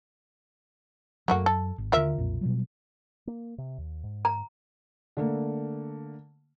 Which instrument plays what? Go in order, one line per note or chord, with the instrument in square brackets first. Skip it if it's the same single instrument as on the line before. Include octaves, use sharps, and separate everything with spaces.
[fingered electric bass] F#2 F#3 [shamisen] A3 A#3 F#4
[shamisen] A4
[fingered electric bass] G#1
[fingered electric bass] D#2 D3 [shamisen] F4 A#4 E5
[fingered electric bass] B1 F2 A#2
B2 F#3 G3
A#3
C3
D#2
G#2
[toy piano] A#5
[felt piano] D3 A3 A#3